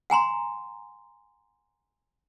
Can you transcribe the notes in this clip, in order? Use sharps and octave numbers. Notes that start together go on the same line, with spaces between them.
F#5 G#5 A#5 C6